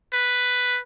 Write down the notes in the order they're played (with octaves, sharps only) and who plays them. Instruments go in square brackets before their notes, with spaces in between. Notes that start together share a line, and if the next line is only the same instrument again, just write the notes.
[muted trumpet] B4